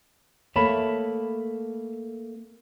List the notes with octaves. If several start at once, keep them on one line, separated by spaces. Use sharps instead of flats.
A3 A#3 C#5 A5 B5